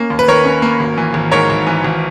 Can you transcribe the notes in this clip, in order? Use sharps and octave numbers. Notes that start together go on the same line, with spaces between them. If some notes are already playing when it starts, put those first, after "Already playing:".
Already playing: A#3 C#4
D#2
B4
D#3 A#4 C#5
C#4
A#3
G#1
E3
G#1
G#2 A#4 C#5
G#1
E3
G#1